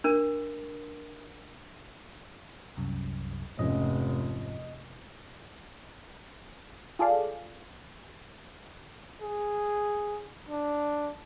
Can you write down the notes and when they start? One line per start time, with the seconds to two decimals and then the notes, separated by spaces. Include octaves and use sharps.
0.04 D4 A#4
2.77 C2 F#2
3.59 F1 G#2 F3 C#4 D#5
6.99 F4 G#4 A4 D5 F5
9.22 G#4
10.49 D4